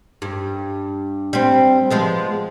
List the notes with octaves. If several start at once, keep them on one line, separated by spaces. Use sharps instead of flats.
G2
G3 C4
F3 G#3 B3